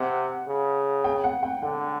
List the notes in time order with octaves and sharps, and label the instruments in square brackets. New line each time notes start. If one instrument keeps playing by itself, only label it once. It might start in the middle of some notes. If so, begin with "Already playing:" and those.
Already playing: [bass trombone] C3 [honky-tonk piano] F#5
[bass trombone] C#3
[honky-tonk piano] G5
F#5
G5
[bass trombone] D3 [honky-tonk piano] F#5